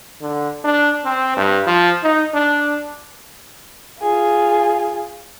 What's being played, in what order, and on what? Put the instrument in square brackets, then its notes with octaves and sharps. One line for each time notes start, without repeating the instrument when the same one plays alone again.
[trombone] D3
D4
C4
G2
F3
D#4
D4
[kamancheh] F4 G#4